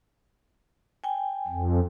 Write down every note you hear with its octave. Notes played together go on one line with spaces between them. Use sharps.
G5 G#5
F2